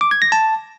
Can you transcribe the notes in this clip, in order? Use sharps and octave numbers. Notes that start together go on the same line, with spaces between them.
D6
G#6
A#6
A5